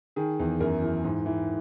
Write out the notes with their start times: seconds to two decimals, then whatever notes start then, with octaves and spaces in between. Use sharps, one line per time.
0.16 D#3 G#4
0.39 E2
0.60 F#2 A#4
0.82 E3
1.04 G#2
1.26 E3